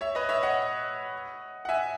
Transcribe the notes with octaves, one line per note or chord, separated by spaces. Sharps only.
C#5 E5
B4 D#5
C#5 E5
D#5 F#5
F#5
E5 G#5